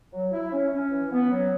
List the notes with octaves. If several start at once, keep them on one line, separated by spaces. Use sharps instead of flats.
F#3
E4
C#4
C#4
E3
B3
F#3